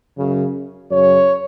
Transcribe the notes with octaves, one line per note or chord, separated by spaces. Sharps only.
F#2 C#3
F#2 C#3 C#5